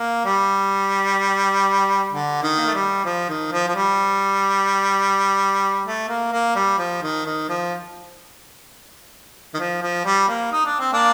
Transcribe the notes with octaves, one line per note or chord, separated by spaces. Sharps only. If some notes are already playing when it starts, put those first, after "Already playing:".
Already playing: A#3
G3
D3
D#3
A#3
A3
G3
F3
D#3
F3
F3
G3
A3
A#3
A#3
G3
F3
D#3
D#3
F3
D#3
F3
F3
G3
A#3
D#4
D4
C4
A#3 D4